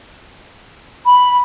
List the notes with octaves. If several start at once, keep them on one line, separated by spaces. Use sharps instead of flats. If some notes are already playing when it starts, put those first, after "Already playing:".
B5